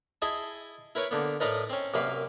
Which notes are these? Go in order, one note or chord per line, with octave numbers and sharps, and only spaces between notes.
E4 G#4 D#5 G#5 A5 D#6
E4 A#4 B4 C#5
D3 A#3 B3
A2 D#4 A#4 B4 D5
C4 C#4
C2 F#2 A#3 B4 F5